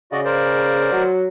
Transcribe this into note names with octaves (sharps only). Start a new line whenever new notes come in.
C#3 F#4 D5 D#5
A#4 C5 D5
F#3